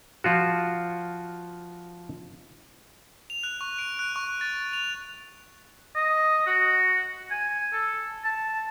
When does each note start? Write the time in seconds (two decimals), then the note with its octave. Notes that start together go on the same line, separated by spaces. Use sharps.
0.24 F3 F4 F#4
3.30 F7
3.43 F#6
3.61 C#6
3.79 D7
3.99 F#6
4.16 C#6
4.27 C#6
4.41 A6
4.73 F7
5.95 D#5
6.47 F#4
7.31 G#5
7.73 A4
8.25 A5